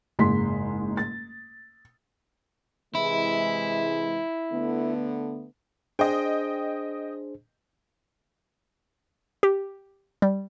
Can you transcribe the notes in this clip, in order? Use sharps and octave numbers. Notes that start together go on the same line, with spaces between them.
F#1 G#2 G#3 C6 B6
A6
C3 E3 G#3 E4
D3 A3 B3
D4 G#4 C5 D#5 G5
G4
G3